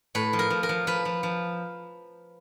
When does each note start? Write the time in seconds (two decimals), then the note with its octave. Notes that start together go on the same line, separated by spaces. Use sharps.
0.15 A2 B4
0.33 F3
0.39 A#4
0.50 F3
0.63 A#4
0.69 F3
0.87 F3 B4
1.05 F3
1.23 F3